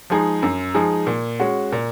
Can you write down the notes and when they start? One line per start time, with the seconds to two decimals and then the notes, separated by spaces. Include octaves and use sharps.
0.10 F3 G#3 D#4 G#4
0.43 F#2
0.74 F3 G#3 D#4 G#4
1.07 A#2
1.40 G#3 C#4 F#4
1.72 A#2